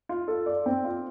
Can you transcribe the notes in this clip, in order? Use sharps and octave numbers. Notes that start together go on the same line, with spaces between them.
F4
A4
D5
C4
F4